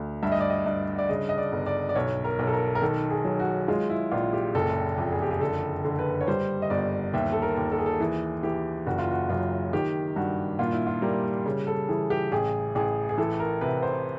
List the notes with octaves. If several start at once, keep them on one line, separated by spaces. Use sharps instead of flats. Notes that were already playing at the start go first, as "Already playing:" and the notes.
Already playing: D2
G2 E5
D#5
D5
D#5
G2 D#5
D5
C#3 D#5
D#5
D5
G1
D5
D5
B1 C#5
A#4
B1
A4
A#4
A#4
D#3 A4
G#4
F#3
F#4
G#3 F4
E4
A#1 F4
G4
F#1 A4
F2
G#4
G4
G#4
D3 A4
D3
B4
C#5
G3 C5
D#5
G1 D5
D#2 E5
A4
A#4
D#2
A4
G#4
A4
E3 G#4
E3 G4
F#1 F#4
F4
F#4
F#2 F4
D#3 G4
G2 F#4
A#2 F4
E4
F4
G3 A#4
C#3
A4
E3 G#4
G4
A1 G#4
A1 G#4
G#4
E3 A4
A#4
C3 B4
C5